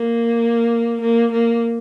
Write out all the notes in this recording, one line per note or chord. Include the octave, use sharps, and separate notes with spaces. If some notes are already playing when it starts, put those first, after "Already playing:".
Already playing: A#3
A#3
A#3